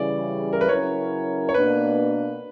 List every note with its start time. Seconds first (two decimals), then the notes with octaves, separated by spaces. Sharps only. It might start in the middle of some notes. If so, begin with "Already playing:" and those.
Already playing: C#3 E3 G3 D5
0.53 A#4
0.61 B4
0.69 C#3 F#3 C#4 E4 A#4 C#5
1.49 C#5
1.54 B2 A#3 D4 B4